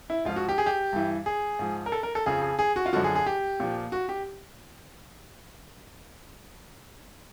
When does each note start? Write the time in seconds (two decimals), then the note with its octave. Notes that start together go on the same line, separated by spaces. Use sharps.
0.10 E4
0.25 G#2 F3 F4
0.36 F#4
0.49 G4
0.58 G#4
0.66 G4
0.93 G2 E3
1.26 G#4
1.59 G#2 F3
1.86 A#4
1.92 A4
2.03 A#4
2.15 A4
2.26 F2 C#3 F3 G#4
2.42 G#4
2.59 G#4
2.76 F#4
2.86 F4
2.93 F#2 D3 F3 F#4
3.04 G#4
3.15 G#4
3.26 G4
3.60 A#2 F3
3.92 F#4
4.09 G4